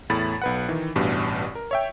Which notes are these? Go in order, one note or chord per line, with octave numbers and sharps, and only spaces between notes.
E2 A2 B5 A6
B1 B4 F#5
D#3 E3
A1 G2 B2
A#4
C#5 E5 G5